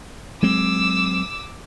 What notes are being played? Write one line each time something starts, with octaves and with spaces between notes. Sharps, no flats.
F#3 G#3 C4 D6 E6